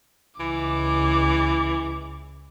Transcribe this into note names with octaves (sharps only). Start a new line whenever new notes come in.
C#2 E3 D6